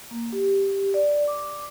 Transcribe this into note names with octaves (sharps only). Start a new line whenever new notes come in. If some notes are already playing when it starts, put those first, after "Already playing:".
A#3
G4
D5
D6